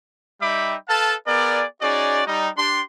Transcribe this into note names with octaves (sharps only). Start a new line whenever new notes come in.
G3 D#4 E5 G5 B5 D6
A4 B4 F5 A5
B3 G#4 A#4 D5
C#4 D#4 F#4 G#4 D5
G3 D#4
D4 G4 C6